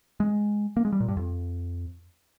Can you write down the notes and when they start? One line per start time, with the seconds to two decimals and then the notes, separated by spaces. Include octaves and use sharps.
0.20 G#3
0.77 A#3
0.85 G#3
0.92 G3
1.00 A#2
1.08 G2
1.17 F2